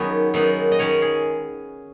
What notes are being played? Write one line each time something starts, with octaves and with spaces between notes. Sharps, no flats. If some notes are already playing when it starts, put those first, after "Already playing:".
Already playing: F#2 D#3 F#3 B3 D#4 F#4 G#4 B4
F#2 D#3 G#3 B3 D#4
D#5
D#3 G#3 C#4 C#5
G#4